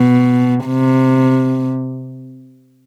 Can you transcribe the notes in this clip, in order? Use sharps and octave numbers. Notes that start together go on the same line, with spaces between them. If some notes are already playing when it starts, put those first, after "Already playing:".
Already playing: B2
C3